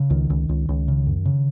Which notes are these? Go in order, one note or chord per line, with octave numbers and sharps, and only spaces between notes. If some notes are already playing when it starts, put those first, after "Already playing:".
Already playing: C#3
C#2 D#3
C#2
C#2
C#2
C#3
F#2
C#3